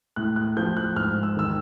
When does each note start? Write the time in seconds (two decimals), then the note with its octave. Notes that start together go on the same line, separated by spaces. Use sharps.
0.16 A2 F#6
0.36 F#6
0.57 F3 G6
0.77 F#6
0.96 G#2 F6
1.23 E6
1.36 D#3 E6